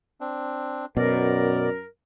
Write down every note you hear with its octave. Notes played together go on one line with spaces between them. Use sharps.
C4 D4
F#2 B2 A#4 D5